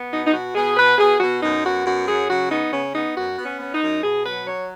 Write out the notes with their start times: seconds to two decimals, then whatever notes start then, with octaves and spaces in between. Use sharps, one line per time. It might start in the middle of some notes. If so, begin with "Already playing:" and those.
Already playing: B3
0.12 B2 D#4
0.26 D#4
0.33 B2 F#4
0.55 B2 G#4
0.77 B2 B4
0.98 B2 G#4
1.20 B2 F#4
1.42 F#2 D#4
1.64 B3 F#4
1.86 F#2 F#4
2.08 F#3 G#4
2.29 C#3 F#4
2.51 B3 D#4
2.73 C#3 C#4
2.95 B3 D#4
3.16 F#2 F#4
3.38 B3
3.46 C#4
3.60 B3
3.75 D#4
3.82 F#2
4.04 B2 G#4
4.25 F#3 B4
4.47 F#3 C#5